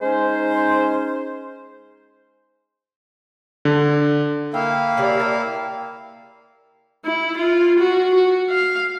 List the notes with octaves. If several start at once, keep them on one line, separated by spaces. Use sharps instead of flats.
G#3 C#4 D#4 C5
D3
A#3 E4 F5 G5
C#3 G3 D5
A#4 G5 A5
E4
F4
F#4
F#4
F5